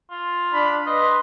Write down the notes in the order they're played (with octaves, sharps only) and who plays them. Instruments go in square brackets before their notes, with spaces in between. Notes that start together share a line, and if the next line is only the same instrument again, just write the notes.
[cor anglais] F4
[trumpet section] D4 B5
[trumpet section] B4 C6 [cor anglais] D#5